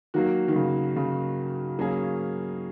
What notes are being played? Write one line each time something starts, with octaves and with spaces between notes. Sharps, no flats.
D#3 F#3 A#3 F#4
D#3
C#3
C#3
F#3 A#3 C#4 G#4